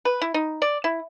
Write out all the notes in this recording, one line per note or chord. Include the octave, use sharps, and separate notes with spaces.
B4
E4
D#4
D5
E4